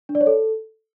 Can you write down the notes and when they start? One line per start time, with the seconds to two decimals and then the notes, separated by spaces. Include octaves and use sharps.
0.09 D4
0.15 D5
0.21 C#5
0.26 A4